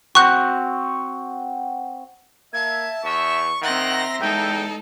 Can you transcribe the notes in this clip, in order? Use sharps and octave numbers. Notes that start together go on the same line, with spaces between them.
C4 F#4 C#6 F#6
A#3 E5 A5 G#6
E2 E5 C#6
D#3 C4 E5 F#5 A#5 C6 A#6
E2 G#3 D#4 A4 G5